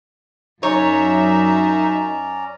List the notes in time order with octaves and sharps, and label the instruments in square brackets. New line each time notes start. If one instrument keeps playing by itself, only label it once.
[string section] F#2 E5 [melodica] C#4 D5 A#5 [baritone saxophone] D#4 [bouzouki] C#5